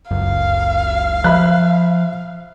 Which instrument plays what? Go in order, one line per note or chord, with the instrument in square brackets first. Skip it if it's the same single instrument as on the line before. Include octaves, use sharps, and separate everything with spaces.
[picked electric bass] F#1 C#2 F#2 [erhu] F5
[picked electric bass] F3 [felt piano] E5 B5 F#6